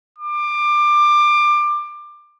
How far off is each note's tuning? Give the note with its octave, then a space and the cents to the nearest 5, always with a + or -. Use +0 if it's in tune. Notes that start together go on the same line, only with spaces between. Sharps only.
D6 +20